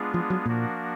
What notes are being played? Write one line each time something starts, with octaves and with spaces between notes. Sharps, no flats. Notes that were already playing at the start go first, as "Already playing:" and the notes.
Already playing: G#3 B3 D4 F4 G#4
F3
F#3
A#2 F3 A#3 D4 F#4 A#4